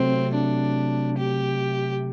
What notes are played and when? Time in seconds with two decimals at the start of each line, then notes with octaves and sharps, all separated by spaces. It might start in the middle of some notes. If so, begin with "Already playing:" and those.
Already playing: C3 F#3 A3 C4
0.34 D4
1.18 G4